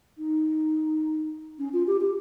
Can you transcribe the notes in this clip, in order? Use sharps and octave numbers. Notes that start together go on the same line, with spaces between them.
D#4
C#4
F4
G4
G4